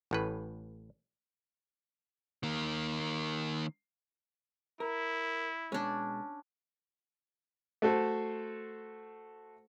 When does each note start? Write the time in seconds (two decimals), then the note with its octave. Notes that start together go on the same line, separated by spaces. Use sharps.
0.11 A1 A2 B4
2.43 D#3 A#3
4.80 E4 A#4
5.72 B2 G#3 C#4 D4
7.82 A3 F#4 A4 C5